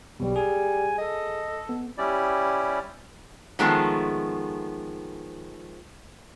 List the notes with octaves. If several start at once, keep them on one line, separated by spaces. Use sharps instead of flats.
B1 B2 G3
G#4 G#5
A4 D#5
B3
G3 C#4 E4 G4 D5
D#3 F3 G#3 A3 B3